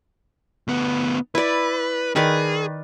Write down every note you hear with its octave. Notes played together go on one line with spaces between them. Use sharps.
D2 B3
E4 B4 D5
D#3 G#4 B4 D5